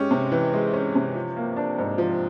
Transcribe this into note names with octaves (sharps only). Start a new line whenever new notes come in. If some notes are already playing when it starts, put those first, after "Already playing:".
Already playing: G#3 C#4 G4
C3
E3
G#3
C#4
C3
F3
A#3
D4
G#2
F3